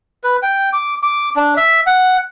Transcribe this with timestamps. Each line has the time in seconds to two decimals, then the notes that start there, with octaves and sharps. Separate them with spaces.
0.24 B4
0.42 G5
0.73 D6
1.03 D6
1.36 D4
1.57 E5
1.86 F#5